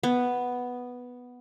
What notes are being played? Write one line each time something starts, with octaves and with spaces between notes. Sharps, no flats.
B3